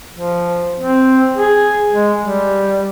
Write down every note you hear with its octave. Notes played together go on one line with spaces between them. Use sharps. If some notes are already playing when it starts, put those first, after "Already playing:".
F3
C4
G#4
G#3
G3